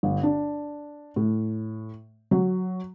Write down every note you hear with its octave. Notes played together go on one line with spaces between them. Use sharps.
G1
D4
A2
F#3